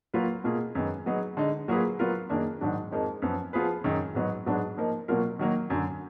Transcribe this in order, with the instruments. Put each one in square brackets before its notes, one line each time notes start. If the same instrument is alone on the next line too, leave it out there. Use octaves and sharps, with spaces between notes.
[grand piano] F#3 A#3 F4 B4
B2 A#3 F4 G#4
F#2 D#3 G#3 B3
F#3 B3 D#4 G#4
D3 G#3 D#4
F#3 A#3 F4 G#4 B4
F#3 B3 F4 A#4
F#2 D#3 A#3 D4 G#4
G#2 D#3 F#3 D4
F2 F3 G#3 D#4 A#4
F#2 F3 B3
F3 B3 F4 G#4 B4
F#2 D#3 G#3
G#2 F#3 B3 D#4
G#2 F#3 B3 D4 G#4
F3 A#3 D#4 A#4
B2 F#3 A#3 F4 A#4
D#3 F#3 A#3
F#2 D3 F#3